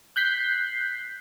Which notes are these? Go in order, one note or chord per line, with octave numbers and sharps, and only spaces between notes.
F#6 G6 B6 C7